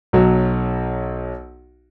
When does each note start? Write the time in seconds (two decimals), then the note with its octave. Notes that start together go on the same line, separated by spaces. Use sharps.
0.13 B1 F#3